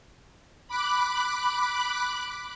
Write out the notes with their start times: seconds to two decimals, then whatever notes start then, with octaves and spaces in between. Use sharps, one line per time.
0.68 B5 D6 F#6